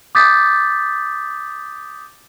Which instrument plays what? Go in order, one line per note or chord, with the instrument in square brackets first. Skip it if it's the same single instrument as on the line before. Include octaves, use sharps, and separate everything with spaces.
[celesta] D6 D#6 G6 A6 B6